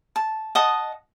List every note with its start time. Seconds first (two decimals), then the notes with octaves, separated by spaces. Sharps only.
0.16 A5
0.55 D#5 F#5 A5 D#6